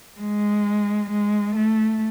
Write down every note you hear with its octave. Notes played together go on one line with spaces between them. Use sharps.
G#3
G#3
A3